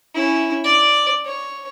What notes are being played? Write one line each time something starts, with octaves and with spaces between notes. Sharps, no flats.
C#4 E4
D5
C#5